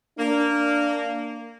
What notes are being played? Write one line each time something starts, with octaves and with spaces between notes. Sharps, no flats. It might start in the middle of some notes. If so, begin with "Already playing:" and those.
A#3 D4